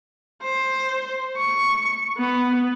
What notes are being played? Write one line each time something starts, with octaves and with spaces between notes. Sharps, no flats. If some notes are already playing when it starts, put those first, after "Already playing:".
C5
C#6
B3